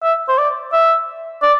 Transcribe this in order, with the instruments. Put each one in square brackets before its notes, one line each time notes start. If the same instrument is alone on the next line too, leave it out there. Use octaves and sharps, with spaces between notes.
[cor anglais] E5
C5
D5
E5
D5